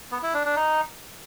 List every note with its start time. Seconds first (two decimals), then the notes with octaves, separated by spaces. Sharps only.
0.11 B3
0.23 E4
0.34 D4
0.45 D4
0.56 D#4